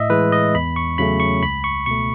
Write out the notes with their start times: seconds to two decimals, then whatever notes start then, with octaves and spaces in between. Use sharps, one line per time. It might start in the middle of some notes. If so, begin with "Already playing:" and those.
Already playing: A2 D#5 E5
0.10 E3 G#3 B4
0.32 D#5
0.54 E2 B5
0.76 C#6
0.98 C#3 F#3 A3 C#4 B5
1.20 C#6
1.43 C#2 B5
1.64 C#6
1.86 B2 A3 C#6